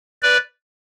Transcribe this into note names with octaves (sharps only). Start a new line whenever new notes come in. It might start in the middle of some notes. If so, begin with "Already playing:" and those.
B4 D5